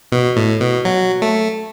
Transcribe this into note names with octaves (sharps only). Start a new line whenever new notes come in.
B2
A2
B2
F#3
A3